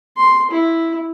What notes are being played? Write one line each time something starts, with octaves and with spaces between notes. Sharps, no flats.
C6
E4